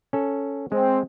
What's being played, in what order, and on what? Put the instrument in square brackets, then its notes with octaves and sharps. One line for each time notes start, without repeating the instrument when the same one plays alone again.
[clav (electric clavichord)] C#4 A4
[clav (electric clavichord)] G#3 [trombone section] C4